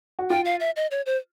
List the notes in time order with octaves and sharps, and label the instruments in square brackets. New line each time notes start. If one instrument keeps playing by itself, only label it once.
[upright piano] F#4
[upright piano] F4 [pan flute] G5
[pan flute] F5
E5
D#5
C#5
C5